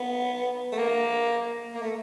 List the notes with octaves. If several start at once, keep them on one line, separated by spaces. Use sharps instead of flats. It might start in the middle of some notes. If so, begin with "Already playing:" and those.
Already playing: B3
A3
A#3
A#3
A3